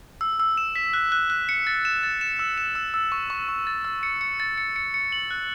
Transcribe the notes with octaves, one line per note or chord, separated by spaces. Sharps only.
E6
E6
E7
B6
F#6
F#6
F#6
C#7
A6
E7
A6
E7
E6
E7
E6
E6
C#6
C#6
C#6
A6
E6
C#7
C#7
A6
C#7
C#7
C#7
F#7
F#6